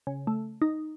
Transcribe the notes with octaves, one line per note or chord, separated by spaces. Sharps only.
C#3
A3
D#4